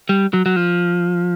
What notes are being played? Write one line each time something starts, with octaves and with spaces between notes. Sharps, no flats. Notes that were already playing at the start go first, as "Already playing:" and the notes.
G3
F#3
F#3
F3